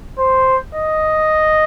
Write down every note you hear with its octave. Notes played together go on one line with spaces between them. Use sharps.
C5
D#5